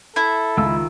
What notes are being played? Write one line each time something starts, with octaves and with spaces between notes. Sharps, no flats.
E4 A4
C#2 D#3 F4 E6